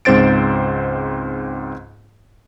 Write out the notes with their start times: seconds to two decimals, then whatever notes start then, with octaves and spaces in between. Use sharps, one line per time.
0.05 C#2 G#2 C4 C5 A6 D7